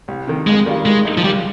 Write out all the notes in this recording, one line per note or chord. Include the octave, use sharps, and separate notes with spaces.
C2
C3 D#3
F2 G#3
D#3 G3 A#3 F4
D#3 G#3
A#3 D#4
F3
C#2 G3